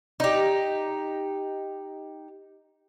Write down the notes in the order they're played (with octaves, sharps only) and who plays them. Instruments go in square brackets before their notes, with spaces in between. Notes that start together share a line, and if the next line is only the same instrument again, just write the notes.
[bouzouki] D#4 G4